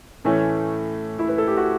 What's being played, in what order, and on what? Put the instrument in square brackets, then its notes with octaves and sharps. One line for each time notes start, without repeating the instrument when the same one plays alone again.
[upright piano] A2 E3 A3 C#4
[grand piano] E4
B4
A4
G4
F#4